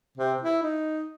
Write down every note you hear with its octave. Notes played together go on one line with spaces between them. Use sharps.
C3
E4
D#4